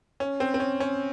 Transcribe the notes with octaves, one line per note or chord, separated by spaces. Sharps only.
C#4
C4
C4
C#4
C#4